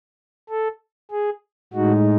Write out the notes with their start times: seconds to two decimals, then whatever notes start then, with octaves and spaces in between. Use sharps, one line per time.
0.49 A4
1.11 G#4
1.73 A2 G#3 D#4 F#4